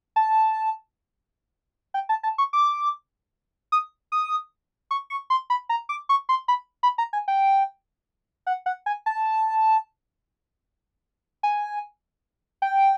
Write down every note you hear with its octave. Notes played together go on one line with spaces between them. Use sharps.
A5
G5
A5
A5
C#6
D6
D#6
D#6
C#6
C#6
C6
B5
A#5
D6
C#6
C6
B5
B5
A#5
G#5
G5
F#5
F#5
G#5
A5
G#5
G5